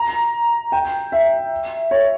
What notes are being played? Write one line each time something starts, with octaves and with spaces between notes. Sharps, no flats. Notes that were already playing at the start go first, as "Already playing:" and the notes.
Already playing: A#5
G5
E5
C#5